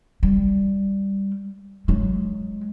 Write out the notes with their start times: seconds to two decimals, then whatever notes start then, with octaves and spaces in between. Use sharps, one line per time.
0.23 G3
1.88 F#3 G#3